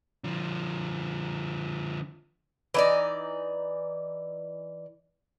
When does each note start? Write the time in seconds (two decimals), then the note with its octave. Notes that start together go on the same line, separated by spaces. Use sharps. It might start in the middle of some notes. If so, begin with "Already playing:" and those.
0.24 D3 F3
2.74 E3 D#4 D5